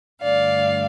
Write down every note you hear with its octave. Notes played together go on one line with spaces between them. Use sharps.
G2 D3 A3 D5 F5